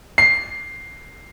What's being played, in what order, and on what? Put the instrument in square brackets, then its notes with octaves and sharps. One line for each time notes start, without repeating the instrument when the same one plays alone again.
[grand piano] C7